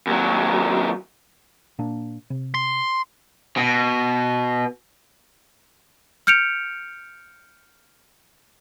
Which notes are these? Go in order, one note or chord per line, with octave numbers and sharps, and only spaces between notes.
D#2 F#3
A#2 A#3 D4
C3
C6
B2
F6 G6 C#7 D7 F7